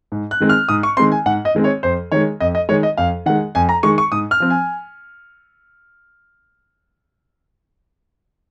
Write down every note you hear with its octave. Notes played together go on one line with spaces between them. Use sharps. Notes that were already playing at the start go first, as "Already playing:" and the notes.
G#2
F#6
D#3 G#3 C4
F6
G#2 D#6
C#6
D#3 G#3 C4 C6
G#5
G#2 F#5
D#5
D#3 G#3 C4
C#5
F2 C5
D#3 G#3 C#5
F2 D#5
D#5
D#3 G#3 C#5
D#5
F2 F5
D#3 G#3 F#5
F2 G#5
A#5
D#3 G#3 C#6
C#6
G#2 D#6
F6
F3 C4
G#5